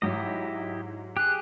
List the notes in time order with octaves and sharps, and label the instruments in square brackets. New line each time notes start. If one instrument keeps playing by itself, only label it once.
[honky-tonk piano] G#2 F#3 [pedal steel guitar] E4 G4 D#5
[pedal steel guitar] G4 G#4 [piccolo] F#6